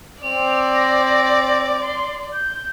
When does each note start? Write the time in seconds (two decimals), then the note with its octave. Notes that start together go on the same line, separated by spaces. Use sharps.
0.23 C4 D5 F7
0.74 A#6
1.80 C6
2.33 G6